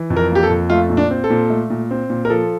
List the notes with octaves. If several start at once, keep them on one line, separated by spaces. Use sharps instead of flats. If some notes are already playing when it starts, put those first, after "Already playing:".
Already playing: E3
F2
A#4
A#3 G4
A4
F2
A3 F4
A#2
D4
C4
A4
A#2
A3
A#2
C4
A#2
A#4
F3 A4